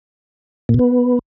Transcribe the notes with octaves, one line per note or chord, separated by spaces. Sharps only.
A#2
B2
B3